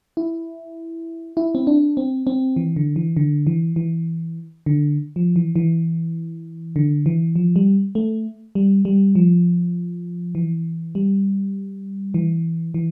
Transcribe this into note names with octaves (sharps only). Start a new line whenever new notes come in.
E4
E4
C4
D4
C4
C4
E3
D3
E3
D3
E3
E3
D3
F3
E3
E3
D3
E3
F3
G3
A3
G3
G3
F3
E3
G3
E3
E3